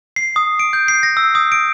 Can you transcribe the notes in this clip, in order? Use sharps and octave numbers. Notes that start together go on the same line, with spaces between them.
C7
D#6
D7
G6
C7
A#6
E6
D#6
D7